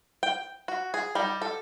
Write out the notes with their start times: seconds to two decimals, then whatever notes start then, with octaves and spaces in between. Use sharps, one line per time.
0.23 G5
0.68 F#4
0.94 G#4
1.15 G3 D#4
1.42 A4